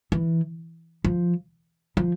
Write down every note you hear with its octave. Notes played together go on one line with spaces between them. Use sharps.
E3
F3
F3